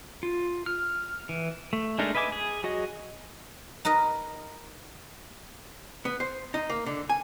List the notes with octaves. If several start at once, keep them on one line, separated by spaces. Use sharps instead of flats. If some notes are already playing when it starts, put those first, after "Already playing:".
F4
F6
E3
A3
G#3 A3 D4 D#4 A#4
B4 D#5 E5 G#5 D6
G#4
F#3 F#4 G#4 D#5
D#4 A#4 B4 D#5
B3
C5
D#4
A#3
D3
G#5